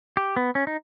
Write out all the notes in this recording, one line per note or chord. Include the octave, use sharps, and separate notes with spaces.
G4
B3
C#4
D#4